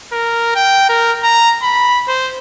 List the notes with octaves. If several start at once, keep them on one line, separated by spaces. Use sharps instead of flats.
A#4
G5
A#4
A#5
B5
C5